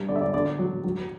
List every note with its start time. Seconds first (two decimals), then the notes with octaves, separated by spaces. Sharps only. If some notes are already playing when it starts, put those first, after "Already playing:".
Already playing: G2
0.09 D3 D5
0.16 E5
0.21 D5
0.34 D3 D5
0.59 F#3
0.84 F#3